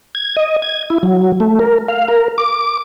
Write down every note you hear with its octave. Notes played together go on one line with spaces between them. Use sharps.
G#6
D#5
G#6
E4
F#3
A3
A#4
F5
A#4
D6